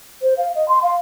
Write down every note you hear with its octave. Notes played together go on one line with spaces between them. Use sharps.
C5
F5
D#5
C6
F5